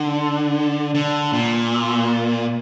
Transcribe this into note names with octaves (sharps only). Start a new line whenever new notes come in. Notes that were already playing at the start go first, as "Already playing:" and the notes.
Already playing: D3
D3
A#2